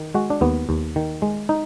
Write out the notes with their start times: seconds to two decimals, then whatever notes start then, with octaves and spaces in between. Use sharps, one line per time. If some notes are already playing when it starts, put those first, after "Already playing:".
Already playing: D#3
0.15 G#3 F#4
0.30 D4
0.41 D#2 B3
0.69 D#2
0.96 D#3
1.22 G#3
1.49 D#4